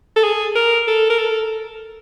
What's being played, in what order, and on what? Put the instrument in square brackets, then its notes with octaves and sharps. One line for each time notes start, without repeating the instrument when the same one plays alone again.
[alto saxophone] A4
G#4
A#4
A4
A#4
A4